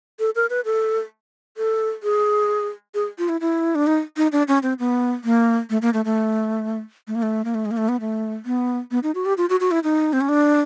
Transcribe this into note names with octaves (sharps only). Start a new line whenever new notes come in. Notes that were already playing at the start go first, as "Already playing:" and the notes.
A4
A#4
B4
A4
A4
G#4
G#4
F4
E4
E4
D4
D#4
D#4
D4
C#4
C4
B3
A#3
A3
A#3
A3
A3
A3
A#3
A3
A#3
A3
G#3
A#3
A3
B3
A3
B3
B3
D#4
F#4
G4
F4
F#4
F#4
E4
D#4
C4
C#4
D4